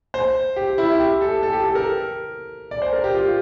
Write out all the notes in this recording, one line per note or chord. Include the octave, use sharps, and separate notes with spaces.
C5
G4
E4
G4
A4
A4
G4
A4
A#4
D5
C5
A#4
G4
F4